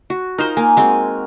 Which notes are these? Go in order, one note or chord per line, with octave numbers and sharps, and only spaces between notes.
F#4
D#4 F4 A#4 C5
A#3 G#5
G#3 C4 F#4